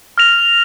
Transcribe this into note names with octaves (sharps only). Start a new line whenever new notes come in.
F6 A#6 F7